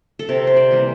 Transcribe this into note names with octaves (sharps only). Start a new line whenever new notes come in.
A4
C3 A#4
C5
D5
E3 G3 A#3